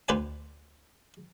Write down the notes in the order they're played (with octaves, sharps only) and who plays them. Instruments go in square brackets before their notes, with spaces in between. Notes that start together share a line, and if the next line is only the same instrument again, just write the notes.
[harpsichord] D2 B4 C5 D5 G#5